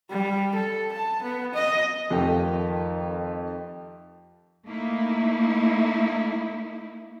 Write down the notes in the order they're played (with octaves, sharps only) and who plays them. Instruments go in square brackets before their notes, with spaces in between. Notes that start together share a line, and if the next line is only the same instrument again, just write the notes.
[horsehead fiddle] G3
A4
A5
B3
D#5
[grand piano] F2 [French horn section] D#3 [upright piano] F3 A3 G4
[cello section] A3 A#3 D#4 E4